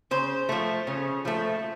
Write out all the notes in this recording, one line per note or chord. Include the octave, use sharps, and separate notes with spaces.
C#3 C5
F3 A3
C#3
F3 A3